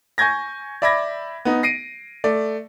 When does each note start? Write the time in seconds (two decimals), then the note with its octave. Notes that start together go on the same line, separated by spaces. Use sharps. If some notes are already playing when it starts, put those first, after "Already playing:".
0.18 G#5 C#6 G6 G#6 A#6
0.82 D5 E5 B5 D6 G#6 A#6
1.45 B3 D#4
1.63 A#6 C7 D7 D#7
2.24 A3 D5